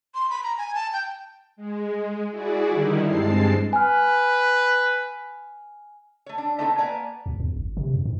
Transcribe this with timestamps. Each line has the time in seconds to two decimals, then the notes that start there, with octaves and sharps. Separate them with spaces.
0.15 C6
0.30 B5
0.43 A#5
0.58 G#5
0.75 A5
0.93 G5
1.56 G#3
2.31 E4 F#4 G#4 D5
2.70 D3 D#3 G3 D#4 E4
3.05 G2 G#3 C4 A5 C7
3.73 B4 G#5 F6
6.26 A3 C#5
6.38 D4
6.59 A3 B3 C4 D#4 G4 A4
6.77 A#3 B3 D5 G#5 A#5
7.26 D2
7.40 E2
7.56 G#1
7.77 C3
7.94 F2
8.06 G#2